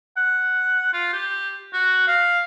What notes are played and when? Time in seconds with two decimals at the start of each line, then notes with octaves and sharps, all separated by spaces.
0.17 F#5
0.93 F4
1.13 G4
1.73 F#4
2.08 F5